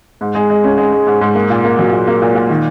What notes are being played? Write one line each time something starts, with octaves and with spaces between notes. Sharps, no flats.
G#2
G#3
G#3
C#4
G#3
G#3
G#2
G#2
A#3
A#2
A#3
F#3
A#2
A#3
A#2
A#2
D#3